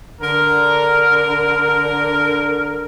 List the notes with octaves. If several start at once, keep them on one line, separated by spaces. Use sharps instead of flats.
D3 A#4